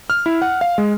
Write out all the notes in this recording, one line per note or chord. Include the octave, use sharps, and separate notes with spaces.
F6
E4
F#5
F5
G#3